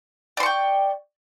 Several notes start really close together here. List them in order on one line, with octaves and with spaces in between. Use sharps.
D5 C6 C#6 G5